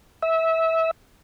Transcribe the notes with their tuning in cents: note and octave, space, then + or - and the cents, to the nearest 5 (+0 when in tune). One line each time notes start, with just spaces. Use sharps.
E5 -20